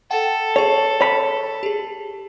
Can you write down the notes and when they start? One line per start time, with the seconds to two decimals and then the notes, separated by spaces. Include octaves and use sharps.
0.11 A4 F#5 G5 A5
0.56 G#4 C#5 C#6
1.01 C#5 B5
1.63 G4 G#4